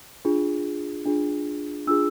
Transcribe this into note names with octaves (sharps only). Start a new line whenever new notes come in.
D4 F4 G#4
D4 F4 G#4
D4 F4 G#4 E6